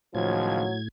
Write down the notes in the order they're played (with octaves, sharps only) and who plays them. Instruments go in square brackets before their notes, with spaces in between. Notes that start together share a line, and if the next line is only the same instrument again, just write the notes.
[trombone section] C#2 D#3 F3 [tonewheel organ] A2 G#6 [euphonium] F#3